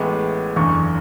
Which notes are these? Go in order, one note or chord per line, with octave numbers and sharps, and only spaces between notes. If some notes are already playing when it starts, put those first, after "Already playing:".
Already playing: A1 A2 G#3 B3 D6
F#1 E2 D3 C#6